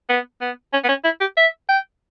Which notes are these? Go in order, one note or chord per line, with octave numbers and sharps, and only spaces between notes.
B3
B3
C#4
B3
C#4
E4
G4
E5
G5